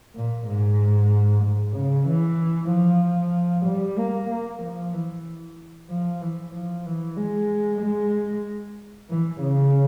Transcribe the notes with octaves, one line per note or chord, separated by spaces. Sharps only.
A#2
G#2
G#2
C#3
E3
F3
G3
A#3
A#3
F3
E3
F3
E3
F3
E3
G#3
G#3
E3
C#3